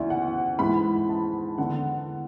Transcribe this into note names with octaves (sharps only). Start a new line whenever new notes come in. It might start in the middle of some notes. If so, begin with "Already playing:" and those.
Already playing: D2 C#3 E3 D5 E5
F#5
G#2 E3 B5
A5
E2 D3 F#5